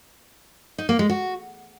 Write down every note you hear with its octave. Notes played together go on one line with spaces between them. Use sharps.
D#4
A#3
G#3
F#4